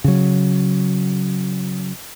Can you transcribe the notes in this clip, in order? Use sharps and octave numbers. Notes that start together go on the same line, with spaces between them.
C#3 F#3